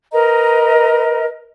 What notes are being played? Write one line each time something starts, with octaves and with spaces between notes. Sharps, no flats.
A#4 B4 D#5 A#5